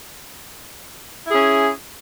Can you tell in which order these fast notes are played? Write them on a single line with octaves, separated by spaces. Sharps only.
E4 G#4 C#4